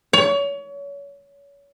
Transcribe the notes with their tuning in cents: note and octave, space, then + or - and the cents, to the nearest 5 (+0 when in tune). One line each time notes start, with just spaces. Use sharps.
C#5 +30